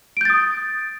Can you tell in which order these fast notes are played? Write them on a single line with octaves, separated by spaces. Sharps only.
D7 G6 A6 D#6